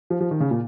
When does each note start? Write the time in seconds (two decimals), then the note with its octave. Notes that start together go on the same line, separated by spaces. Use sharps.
0.10 F3
0.20 F3
0.31 D#3
0.40 C#3
0.51 A#2